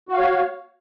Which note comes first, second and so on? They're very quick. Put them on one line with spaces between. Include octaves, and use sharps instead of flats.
F#4 F5 C#5